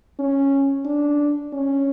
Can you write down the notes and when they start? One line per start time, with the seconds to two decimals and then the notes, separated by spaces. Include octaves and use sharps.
0.19 C#4
0.85 D4
1.53 C#4